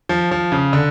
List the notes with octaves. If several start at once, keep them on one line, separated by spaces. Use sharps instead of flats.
F3
F3
C#3
D3